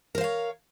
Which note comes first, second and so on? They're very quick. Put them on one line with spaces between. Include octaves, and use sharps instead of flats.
A#4 C5 F5 C#5